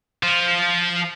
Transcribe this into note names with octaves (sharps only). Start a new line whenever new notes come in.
F3 F4